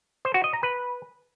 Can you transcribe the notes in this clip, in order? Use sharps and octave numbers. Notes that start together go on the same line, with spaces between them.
C5
F#4
D#5
A#5
B4